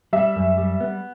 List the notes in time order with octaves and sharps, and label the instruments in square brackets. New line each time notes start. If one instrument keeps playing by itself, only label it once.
[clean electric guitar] G3 [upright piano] E5
[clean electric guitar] F#2
G3
B3